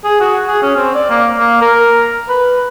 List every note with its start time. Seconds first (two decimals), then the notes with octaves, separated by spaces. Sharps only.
0.04 G#4
0.20 F#4
0.48 G#4
0.63 C#4
0.77 C4
0.95 D5
1.10 A#3
1.38 A#3
1.61 A#4
2.29 B4